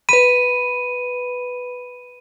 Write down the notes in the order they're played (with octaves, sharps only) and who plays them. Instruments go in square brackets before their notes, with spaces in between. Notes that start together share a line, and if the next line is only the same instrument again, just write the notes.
[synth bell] B4 B5 [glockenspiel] D#7